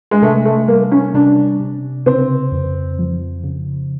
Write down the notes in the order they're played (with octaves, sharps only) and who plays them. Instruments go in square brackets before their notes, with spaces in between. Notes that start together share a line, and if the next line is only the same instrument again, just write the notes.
[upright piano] G#3
[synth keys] C3 [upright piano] A3
[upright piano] A3
[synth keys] G3 [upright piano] A#3
[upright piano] C#4
[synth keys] C3 [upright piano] D4
[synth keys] C3
[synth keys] C#3 [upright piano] C4
[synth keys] F2
F3
C#3